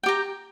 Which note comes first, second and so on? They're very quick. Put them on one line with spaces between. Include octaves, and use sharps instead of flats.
G5 G4 A#5